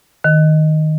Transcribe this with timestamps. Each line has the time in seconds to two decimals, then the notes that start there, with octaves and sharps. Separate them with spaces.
0.24 D#3